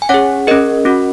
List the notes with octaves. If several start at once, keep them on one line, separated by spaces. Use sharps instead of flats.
G#5
C#4 G#4 C#5 F#5
C#4 G#4 A#4 D#5
C#4 F#4